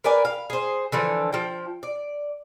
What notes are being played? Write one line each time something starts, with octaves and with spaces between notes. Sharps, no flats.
A#4 B4 D5 G#5
F5
G#4 C5
D3 E3 F3 A4
F3 G5
D5